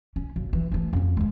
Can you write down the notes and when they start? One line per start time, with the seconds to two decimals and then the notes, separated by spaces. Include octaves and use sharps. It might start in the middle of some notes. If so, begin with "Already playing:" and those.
0.16 C#4
0.36 F#1
0.53 E3
0.72 E3 A3
0.93 F2 C#4
1.17 G#3 A#3